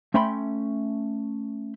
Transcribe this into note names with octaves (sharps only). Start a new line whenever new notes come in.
A3 C#4 E5 G5 B5 C6